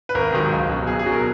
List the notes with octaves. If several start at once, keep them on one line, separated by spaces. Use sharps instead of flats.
B4
G#1 A#4
G#2 D#3 F#3
C#2
B2 F#3
B1 G#4
G#4
B2 F#3
A#4